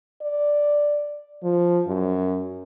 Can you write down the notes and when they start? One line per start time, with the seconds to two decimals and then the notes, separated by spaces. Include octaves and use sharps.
0.22 D5
1.44 F3
1.87 F#2